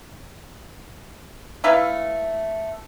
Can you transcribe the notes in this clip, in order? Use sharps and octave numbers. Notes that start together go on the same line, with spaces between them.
A3 E4 B4 F5